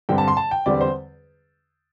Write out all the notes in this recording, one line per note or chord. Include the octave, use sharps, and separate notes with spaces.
G2 D3 G3 C4 G5
A5
C6
A5
G5
E2 D3 G3 C4 D5
C5